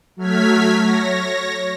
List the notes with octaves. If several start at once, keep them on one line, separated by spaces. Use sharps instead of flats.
F#3 A3 F6 G#6 B6
C#5 A#6